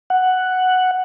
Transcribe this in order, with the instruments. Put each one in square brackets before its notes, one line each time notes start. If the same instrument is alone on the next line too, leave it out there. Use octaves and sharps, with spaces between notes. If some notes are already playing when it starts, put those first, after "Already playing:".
[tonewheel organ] F#5